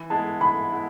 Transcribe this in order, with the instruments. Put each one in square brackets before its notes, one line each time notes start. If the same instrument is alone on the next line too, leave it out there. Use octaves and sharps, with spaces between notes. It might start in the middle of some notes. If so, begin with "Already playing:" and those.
Already playing: [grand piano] E3
[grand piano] G#3 B3 E4 [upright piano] A5
[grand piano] E3 [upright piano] B5
[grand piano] G#3 B3 E4